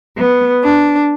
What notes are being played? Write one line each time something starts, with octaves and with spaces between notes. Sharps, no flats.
B3
D4